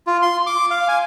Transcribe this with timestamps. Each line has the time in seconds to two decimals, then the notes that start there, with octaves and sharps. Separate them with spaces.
0.07 F4
0.22 C6
0.47 D6
0.70 F5
0.88 G#5